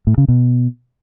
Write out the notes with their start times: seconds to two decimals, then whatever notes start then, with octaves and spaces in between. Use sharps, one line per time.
0.07 A2
0.18 C#3
0.28 B2